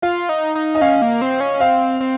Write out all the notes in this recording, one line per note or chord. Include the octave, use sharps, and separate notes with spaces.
F4 F5
D#4
D#4
D#5
C#4 F5
A#3
C4
C#4
C4 F5
C4